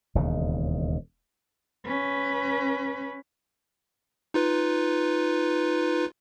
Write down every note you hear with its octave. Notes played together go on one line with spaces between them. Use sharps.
E1 D#2 C#3
C#4 B4
D#4 F4 B4